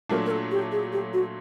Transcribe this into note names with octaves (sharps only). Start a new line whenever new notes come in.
A#2 F#3 A3 D4 A#4
A#4
A4
G4
G#4
G4
F#4